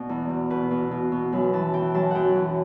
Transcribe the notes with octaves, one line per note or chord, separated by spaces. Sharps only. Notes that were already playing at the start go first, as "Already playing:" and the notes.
Already playing: B2 D5
E2
B2
B2 B4
B2
B2
B2
F#2 B4
E3 A5
E3 G5
F#2 A5
F#2 F#5 G5
E3